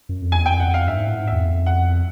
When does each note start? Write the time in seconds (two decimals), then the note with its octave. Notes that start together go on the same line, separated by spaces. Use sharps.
0.09 F#2
0.22 F2
0.32 E2 G#5
0.46 F2 G5
0.60 F#5
0.68 F2
0.74 F5
0.88 G2 E5
0.97 G#2
1.07 A2
1.17 G#2
1.27 E2 E5
1.40 F2
1.47 E2
1.53 F2
1.66 F#5